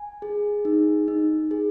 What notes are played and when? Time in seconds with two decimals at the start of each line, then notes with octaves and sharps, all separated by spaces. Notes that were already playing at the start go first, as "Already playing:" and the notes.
Already playing: G#5
0.22 G#4
0.65 D#4
1.08 D#4
1.51 G#4